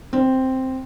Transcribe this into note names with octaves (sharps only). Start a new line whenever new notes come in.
C4